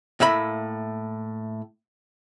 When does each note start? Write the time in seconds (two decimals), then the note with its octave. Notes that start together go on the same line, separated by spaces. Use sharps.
0.20 A2 A#3 E5 B5